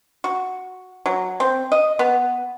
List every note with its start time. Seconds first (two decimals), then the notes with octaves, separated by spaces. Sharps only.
0.24 F#4
1.06 F#3
1.40 C4
1.72 D#5
1.99 B3